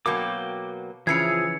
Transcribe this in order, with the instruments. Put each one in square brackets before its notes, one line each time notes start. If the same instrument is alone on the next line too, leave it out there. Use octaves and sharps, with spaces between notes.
[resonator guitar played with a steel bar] B2 F#3 A#3 [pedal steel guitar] G5 D6
[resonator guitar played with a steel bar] C#3 E3 C#4 [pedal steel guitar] F3 G#4 [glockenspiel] G#6 C7 C#7